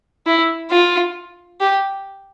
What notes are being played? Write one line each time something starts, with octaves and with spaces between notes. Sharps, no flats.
E4
F4
G4